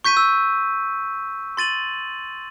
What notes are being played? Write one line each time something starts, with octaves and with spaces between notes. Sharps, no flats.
C#6 G6 B6 D#7
E6
C6 A6 D#7 F#7